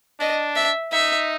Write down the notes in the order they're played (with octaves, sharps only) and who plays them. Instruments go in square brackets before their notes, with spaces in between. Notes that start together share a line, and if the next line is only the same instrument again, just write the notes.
[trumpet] D4 [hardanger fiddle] D#5
[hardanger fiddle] E5
[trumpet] D#4 [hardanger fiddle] E5